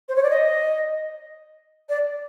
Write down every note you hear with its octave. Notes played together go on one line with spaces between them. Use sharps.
C5
C#5
D5
D#5
D5